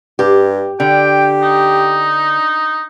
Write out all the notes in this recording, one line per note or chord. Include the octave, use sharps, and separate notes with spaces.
G2 G4
D3 G4 G5
D#4